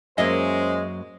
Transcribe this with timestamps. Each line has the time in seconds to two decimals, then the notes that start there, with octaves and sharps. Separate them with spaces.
0.18 F#2 F#3 G#3 A#3 C#4 C5 D#5 E5